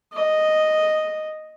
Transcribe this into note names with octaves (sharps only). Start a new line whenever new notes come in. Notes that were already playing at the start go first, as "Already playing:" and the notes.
D#5